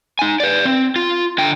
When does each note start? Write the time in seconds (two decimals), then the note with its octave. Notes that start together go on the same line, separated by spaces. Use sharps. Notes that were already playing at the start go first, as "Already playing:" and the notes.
0.19 D#4 G#5
0.40 B4 D5
0.65 C4
0.96 F4
1.38 D3 G5